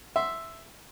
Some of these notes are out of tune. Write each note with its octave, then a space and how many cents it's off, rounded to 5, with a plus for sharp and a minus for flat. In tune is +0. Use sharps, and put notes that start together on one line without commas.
E5 +0 C6 +0